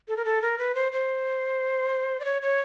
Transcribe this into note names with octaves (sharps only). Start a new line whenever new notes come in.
A4
A#4
A4
A#4
B4
C5
C5
D5
C#5
C#5